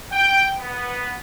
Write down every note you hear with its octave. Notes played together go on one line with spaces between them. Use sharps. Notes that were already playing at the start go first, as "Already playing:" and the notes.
G5
B3